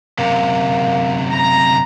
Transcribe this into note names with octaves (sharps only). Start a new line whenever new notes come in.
F#2 C3 A#3
A#5